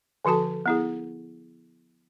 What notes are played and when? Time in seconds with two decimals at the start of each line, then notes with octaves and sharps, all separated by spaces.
0.25 D3 F3 F#4 A4 A5
0.66 B3 E4 G#4